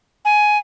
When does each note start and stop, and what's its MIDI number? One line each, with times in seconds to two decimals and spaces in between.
0.25 0.58 80